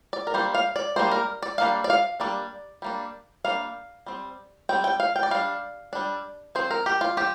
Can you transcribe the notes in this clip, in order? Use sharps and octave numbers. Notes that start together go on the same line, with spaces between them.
D5
A#4
G3 A#3 D4 C5
F5
D5
G3 A#3 D4 C5
A#4
D5
G3 A#3 D4 F5
D5
F5
G3 A#3 D4 D5
G3 A#3 D4
G3 A#3 D4 F5
G3 C4
G3 C4 G5
G5
F5
G5
D5
G3 D4 F5
G3 D4
F3 C4 C5
A#4
G4
F4
F3 G4